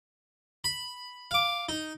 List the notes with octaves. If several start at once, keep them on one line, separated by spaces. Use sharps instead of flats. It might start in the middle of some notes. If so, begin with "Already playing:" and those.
B5
F5 D6
D#4